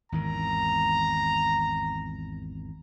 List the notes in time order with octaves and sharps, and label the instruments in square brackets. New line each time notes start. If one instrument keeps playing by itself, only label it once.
[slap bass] G#1 E2 D#3 [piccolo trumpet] A#5